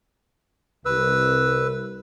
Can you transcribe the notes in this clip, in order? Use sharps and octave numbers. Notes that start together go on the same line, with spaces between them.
C2 B4 E6